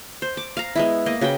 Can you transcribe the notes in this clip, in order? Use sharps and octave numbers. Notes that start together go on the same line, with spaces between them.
C5
D6
F5 A#5
G#3 B3 E4
A#3 D#5
C#3 F#4 B4 G5